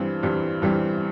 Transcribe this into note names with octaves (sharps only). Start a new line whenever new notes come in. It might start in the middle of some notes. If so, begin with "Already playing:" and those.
Already playing: G2 E3 G3 C4
G2 E3 G3 C4
G2 E3 G3 C4